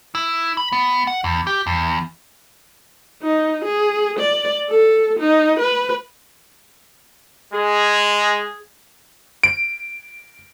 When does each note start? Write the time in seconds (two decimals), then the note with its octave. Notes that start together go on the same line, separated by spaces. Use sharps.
0.15 E4
0.57 B5
0.72 B3
1.07 F#5
1.24 E2
1.47 G4
1.67 E2
3.22 D#4
3.65 G#4
4.19 D5
4.70 A4
5.20 D#4
5.60 B4
7.53 G#3 G#4
9.43 D7